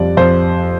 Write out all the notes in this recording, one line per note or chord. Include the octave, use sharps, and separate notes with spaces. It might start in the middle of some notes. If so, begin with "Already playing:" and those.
Already playing: F2 G3 D5
F2 C5